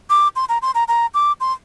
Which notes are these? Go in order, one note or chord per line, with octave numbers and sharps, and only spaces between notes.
D6
C6
A#5
C6
A#5
A#5
D6
C6